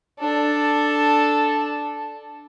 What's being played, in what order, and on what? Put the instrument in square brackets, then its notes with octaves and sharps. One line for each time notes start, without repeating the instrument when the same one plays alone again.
[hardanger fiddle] D4 A4